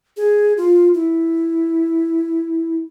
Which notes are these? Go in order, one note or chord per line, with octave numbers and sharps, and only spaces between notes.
G#4
F4
E4